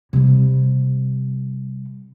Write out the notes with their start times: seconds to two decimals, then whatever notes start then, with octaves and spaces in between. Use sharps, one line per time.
0.13 C3 G3